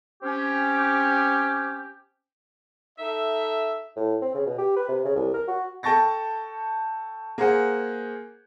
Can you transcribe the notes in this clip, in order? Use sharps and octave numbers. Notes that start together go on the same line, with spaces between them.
C4 C#4 G4
D#4 A4 E5
A2
C4
C#3
B2
G4
B4
C3
C#3
C2
A#4
F#4
A4 G5 A5 C#6 A6 A#6
A#3 G#4 C5 F#5 G#5